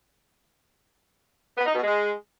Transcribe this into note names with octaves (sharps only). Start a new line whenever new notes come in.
B3
D#4
B2
G#3